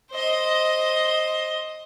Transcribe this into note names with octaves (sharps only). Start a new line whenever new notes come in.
C5 D#5